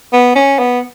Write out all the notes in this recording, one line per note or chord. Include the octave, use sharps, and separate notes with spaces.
B3
C#4
B3